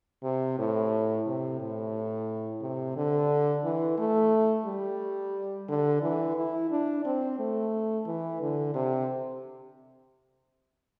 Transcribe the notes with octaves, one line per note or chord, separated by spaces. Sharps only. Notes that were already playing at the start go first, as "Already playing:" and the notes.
C3
A2
C3
A2
C3
D3
E3
A3
G3
D3
E3
E4
D4
C4
A3
E3
D3
C3